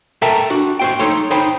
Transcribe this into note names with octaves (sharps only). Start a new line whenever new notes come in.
A4 A#4 E5 G5 A5 A#5
D4 F#4
F#4 C5 G5
D#4 A4 C#5 C6
D#4 C5 G5 B5